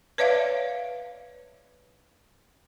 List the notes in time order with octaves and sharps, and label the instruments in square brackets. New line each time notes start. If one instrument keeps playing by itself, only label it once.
[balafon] B4 C#5 D5 E5 F5